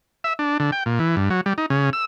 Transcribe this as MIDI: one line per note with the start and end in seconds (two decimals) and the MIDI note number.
0.24 0.33 76
0.39 0.58 62
0.60 0.71 50
0.72 0.84 79
0.86 0.99 46
0.99 1.16 52
1.17 1.29 43
1.30 1.41 54
1.46 1.53 55
1.58 1.66 63
1.70 1.90 49
1.93 2.05 88